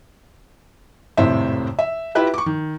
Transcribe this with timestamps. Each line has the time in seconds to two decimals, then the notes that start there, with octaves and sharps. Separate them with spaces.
1.17 G#1 F2 A2 C3 C5 E5
1.79 E5
2.15 E4 F4 G4 B4 E5
2.34 C#6 D6
2.46 D#3